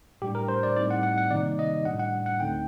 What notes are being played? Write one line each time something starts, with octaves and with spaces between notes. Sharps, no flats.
A2 G3 D4 G4
A#4
C5
D5
A2 G3 C4 D#4 D5
F#5
F#5
F#5
C3 D#3 G3 A#3 D#4 D5
D#5
A2 G3 D4 F#5
F#5
F#5
D2 D3 A3 C4 D#4 G5